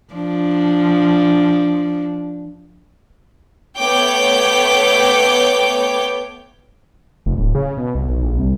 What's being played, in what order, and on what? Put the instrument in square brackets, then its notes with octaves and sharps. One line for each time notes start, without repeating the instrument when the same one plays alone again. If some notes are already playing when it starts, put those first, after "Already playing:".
[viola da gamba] F3 D4
[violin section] A3 B3 C#5 G5 D6 G6
[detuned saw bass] F1
D1
C#3
B2
C2
B1
A#1
C2